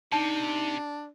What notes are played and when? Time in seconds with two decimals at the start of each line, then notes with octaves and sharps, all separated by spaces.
0.12 C3 D4 D#4 A5